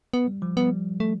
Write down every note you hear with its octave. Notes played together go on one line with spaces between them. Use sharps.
B3
G3
F3
G3 B3
A3